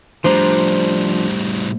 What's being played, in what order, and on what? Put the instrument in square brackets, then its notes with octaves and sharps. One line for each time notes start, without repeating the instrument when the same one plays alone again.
[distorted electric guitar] A2 G3 [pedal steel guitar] F3 D4 A#5 [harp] C5